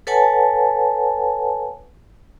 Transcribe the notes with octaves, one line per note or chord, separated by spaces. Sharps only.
A4 B4 C#5 F#5 G#5 A5